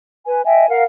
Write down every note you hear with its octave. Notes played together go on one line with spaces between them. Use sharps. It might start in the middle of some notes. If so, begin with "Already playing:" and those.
B4 G#5
D#5 E5 G5 G#5
A#4 F5 F#5